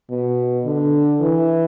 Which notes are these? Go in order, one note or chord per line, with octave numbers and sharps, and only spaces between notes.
B2
D3
E3